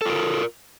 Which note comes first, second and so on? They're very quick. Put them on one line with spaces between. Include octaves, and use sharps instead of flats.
A4 F4 A#4